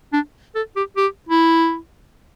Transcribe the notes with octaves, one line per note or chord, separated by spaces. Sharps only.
D4
A4
G4
G4
E4